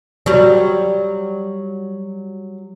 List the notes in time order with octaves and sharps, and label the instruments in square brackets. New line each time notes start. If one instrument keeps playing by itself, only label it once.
[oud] F#3 G3